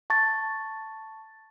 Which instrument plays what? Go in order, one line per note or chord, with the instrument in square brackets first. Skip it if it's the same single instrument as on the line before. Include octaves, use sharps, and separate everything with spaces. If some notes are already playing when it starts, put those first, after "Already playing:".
[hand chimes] A5 C#6 A6